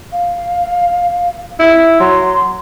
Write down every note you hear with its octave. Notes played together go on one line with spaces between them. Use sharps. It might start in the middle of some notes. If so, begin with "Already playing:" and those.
F5
E4
F#3 C6